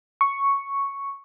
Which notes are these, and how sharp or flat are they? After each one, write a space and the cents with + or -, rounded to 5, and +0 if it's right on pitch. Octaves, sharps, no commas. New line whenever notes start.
C#6 +0